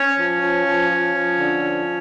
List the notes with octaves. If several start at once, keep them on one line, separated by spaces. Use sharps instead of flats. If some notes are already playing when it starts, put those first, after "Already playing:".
Already playing: C#4 C#5
F3
F3
F3
F3
F3
D3
F3